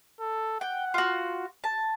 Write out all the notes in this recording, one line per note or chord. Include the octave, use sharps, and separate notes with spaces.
A4
F#5 G5
F4 F#4
A5